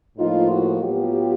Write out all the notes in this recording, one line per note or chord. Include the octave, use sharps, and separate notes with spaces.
A2 F3 A#3 D#4 F4
E4 F#4
A2 F#3 B3 F4 G4